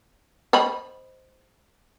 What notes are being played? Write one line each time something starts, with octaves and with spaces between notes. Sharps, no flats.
C5 D#5 B5